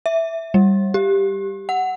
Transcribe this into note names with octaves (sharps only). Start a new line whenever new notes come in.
E5
G3
G4
F#5